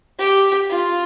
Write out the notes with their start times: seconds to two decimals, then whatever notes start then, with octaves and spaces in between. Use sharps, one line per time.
0.19 G4
0.70 F4